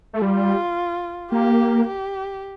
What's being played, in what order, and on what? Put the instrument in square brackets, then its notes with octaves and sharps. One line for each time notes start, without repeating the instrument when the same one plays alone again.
[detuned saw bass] A3
[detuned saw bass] G3 [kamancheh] F4
[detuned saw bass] A#3 [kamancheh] G4
[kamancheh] G4